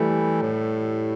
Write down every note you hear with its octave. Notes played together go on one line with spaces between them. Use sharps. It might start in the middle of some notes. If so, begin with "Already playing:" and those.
Already playing: E3 G3 A3 E4
A2